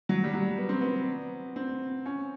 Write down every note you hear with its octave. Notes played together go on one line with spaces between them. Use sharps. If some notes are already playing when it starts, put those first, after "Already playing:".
F#3
G3
F#3
B3
C4
B3
C4
C#4